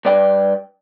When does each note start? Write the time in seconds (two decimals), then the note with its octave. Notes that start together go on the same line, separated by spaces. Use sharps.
0.05 G2 D5 G5